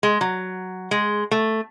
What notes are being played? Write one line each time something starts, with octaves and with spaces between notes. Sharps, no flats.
G#3
F#3
G#3
A3